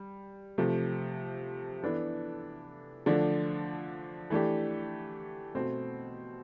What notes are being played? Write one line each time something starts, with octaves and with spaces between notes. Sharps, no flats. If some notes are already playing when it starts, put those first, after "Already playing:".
Already playing: G3
C3 F3 A3
E3 B3 D4 A4
D3 F3 A3 D4
E3 A3 D4 G4
B2 A3 C4